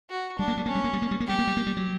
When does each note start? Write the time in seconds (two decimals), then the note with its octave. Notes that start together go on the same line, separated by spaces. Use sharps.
0.10 F#4
0.39 G3 D4
0.48 A#3
0.57 G3
0.66 A#3 C#4
0.75 G3
0.84 A#3
0.93 G3
1.02 A#3
1.11 G3
1.20 A#3
1.27 G3 G4
1.39 A#3
1.47 G3
1.57 A#3
1.67 G3
1.77 F#3